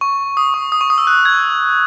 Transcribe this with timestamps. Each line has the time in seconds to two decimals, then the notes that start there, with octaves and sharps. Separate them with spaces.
0.01 C#6
0.37 D#6
0.54 C#6
0.72 D#6
0.81 C#6
0.90 D#6
0.98 E6
1.07 F#6
1.25 G#6